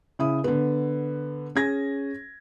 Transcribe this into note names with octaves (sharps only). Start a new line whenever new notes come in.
C#3 E4 D#6
D3 B3
C#4 G#4 G#6 A#6